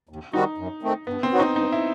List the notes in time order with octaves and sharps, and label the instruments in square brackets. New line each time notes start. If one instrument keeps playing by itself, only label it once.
[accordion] D#2
[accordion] D#3 G3 C4 F#4 [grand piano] D#4
[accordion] F#2
D#3 A3 C4
[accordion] G2 [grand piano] B3
[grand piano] C4
[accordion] D#3 F#3 B3 F#4
[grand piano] D#4
[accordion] G2 [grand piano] D#4
[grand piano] E4